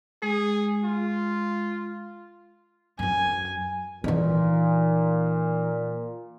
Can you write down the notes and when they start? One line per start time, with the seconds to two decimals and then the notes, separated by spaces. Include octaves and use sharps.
0.23 G#3 G#4
0.84 F4
2.99 F#2 F#3 G#5
4.04 A#2 E3 D#4